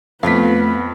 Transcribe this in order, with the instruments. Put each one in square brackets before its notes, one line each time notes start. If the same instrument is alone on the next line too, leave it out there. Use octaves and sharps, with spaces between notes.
[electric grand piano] F2 B6 [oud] A3 F4 F5 [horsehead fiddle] B3 B4